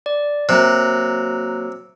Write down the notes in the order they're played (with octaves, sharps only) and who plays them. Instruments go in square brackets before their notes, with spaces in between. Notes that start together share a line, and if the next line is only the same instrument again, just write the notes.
[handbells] D5
[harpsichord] C3 [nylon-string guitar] F#3 A#3 [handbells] A#5 F#6